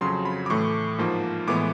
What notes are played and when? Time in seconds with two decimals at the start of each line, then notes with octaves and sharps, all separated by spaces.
0.01 F2 C#3 F#3 C6
0.25 B5
0.46 D6
0.50 A2 E3 A3 C#6
0.98 G#2 F3 A#3
1.47 A2 E3 G#3 B3 D6